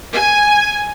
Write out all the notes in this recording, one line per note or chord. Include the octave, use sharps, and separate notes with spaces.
G#5